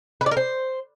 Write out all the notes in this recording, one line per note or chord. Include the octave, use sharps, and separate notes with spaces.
B4
D5
A#4
C5